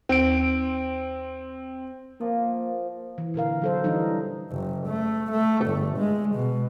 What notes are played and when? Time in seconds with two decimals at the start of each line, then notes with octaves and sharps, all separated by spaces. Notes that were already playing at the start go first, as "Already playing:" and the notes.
0.09 D#2 C4 D7
2.21 F3 A#3
3.18 E3
3.34 A#2 D3 A#4 F5
3.62 F#3 A4 C5
3.84 E3 F3 G3 D4 D#4
4.51 F#1
4.87 A3
5.31 A3
5.66 G1
5.98 G#3
6.35 B2